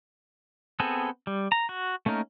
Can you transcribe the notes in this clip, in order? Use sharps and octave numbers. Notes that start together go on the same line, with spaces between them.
B3 C4 G#4 A4
G3
A#5
F#4
A3 A#3 C#4 D#4 A#4